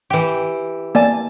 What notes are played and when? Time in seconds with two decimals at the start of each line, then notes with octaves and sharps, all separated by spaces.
0.10 E3 G4
0.95 A#3 D5 G#5 A5